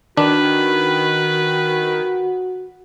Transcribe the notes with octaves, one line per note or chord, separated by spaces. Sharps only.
D#3 D4 F#4 B4